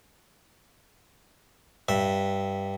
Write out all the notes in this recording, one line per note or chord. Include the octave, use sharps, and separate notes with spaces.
G2 E5